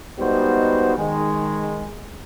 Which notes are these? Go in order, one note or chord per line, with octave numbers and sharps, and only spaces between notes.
G3 G#3 B3 D#4 F#4 C5
D#3 G#3